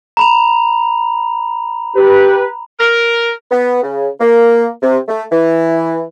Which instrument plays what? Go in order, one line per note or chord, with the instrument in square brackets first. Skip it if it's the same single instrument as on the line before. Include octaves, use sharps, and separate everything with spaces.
[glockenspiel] A#5 B5 F7
[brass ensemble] G4 B4
[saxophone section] A#4
[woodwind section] B3
C#3
A#3
C3
A3
E3